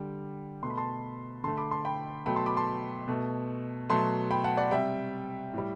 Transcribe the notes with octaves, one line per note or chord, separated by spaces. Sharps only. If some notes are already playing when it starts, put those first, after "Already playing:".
Already playing: D3 G3 G5
B2 A3 C6
B5
A5 C6
D3 A3 A5 C6
B5 D6
A5 C6
G5 B5
B2 F#3 A3 G5 B5
A5 C6
B5 D6
A5 C6
B2 A3
B2 F#3 A3 A5 C6
G5 B5
F#5 A5
D5 F#5
C3 G3 E5 G5
A2 G3